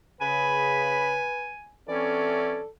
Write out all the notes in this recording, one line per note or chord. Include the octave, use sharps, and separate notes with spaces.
C#3 B4 G#5 B5
E3 C4 C#4 A4 D5